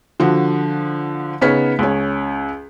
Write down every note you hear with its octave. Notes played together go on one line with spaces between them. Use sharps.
D3 F3 F#4
C#3 B3 D#4 C#5 F6 B6
C#2 C#4